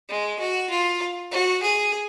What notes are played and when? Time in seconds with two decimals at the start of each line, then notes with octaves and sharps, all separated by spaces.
0.09 G#3
0.39 F#4
0.70 F4
1.31 F#4
1.62 G#4